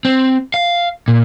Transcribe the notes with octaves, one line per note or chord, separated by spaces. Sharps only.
C4
F5
A#2